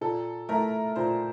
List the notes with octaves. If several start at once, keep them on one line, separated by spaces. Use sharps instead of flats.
A#2 A4
A3 E4 A#4
A#2 C5